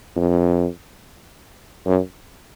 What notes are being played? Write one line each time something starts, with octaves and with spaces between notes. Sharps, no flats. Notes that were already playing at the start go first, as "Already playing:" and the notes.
F2
F#2